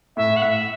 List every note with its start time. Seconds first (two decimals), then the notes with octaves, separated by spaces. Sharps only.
0.16 A2 E5
0.36 F#5
0.42 A2 E5